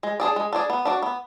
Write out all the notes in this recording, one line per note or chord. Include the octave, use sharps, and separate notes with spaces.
G#3
D4 G#4 D5
G#3
D4 G#4 D5
B3
D4 F#4 D5
B3